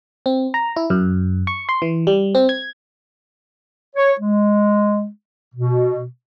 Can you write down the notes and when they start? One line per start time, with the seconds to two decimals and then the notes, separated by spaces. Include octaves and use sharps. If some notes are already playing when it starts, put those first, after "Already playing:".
0.26 C4
0.54 A#5
0.76 E4
0.90 F#2
1.47 C#6
1.69 C6
1.82 E3
2.07 G3
2.35 C4
2.49 G#6
3.96 C#5
4.20 G#3
5.55 B2